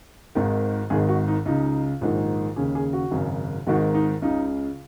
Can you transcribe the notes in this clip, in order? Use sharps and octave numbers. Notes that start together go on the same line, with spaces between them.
G#1 G#2 D#3
G#1 G#2 D#3 G#4
F#4
D#4
C#2 C#3 D#4
A#1 G#2 D#3
D#2 C#3 G#4
G#4
F#4
G#1 F#2 C#3
G#1 G#2 D#3 F#4
D#4
C#2 C#3 D#4